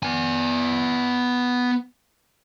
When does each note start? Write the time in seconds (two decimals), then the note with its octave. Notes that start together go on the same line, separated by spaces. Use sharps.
0.03 B3 G#5